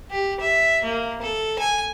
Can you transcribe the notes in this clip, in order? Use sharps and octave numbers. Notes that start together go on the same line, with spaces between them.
G4
E5
A#3
A4
G#5